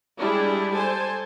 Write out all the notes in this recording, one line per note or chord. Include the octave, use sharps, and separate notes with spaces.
G3 G#3 D4 E4 G4 G#4
A4 C5 G#5 A5